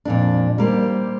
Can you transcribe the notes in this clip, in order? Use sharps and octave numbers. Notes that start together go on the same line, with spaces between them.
F2 A#2 D4
G3 A#3 G4 C5